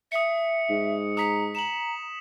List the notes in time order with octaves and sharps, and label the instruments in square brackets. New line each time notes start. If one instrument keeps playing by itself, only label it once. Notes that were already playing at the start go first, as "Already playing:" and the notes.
[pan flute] E5 [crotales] D#6 C#7
[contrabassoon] G#2
[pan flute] A#5 [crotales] D#6 B6
[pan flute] A#5 [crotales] E7 F#7